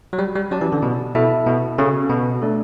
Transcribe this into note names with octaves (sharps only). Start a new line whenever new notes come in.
F#3
G3
G3
F#3 C#4 G4 D5 A5
E3
D3
B2
B2 E4 A4 E5 A5
B2
C#3 C#4 F#4 A4
B2
A3 D4 A4 D5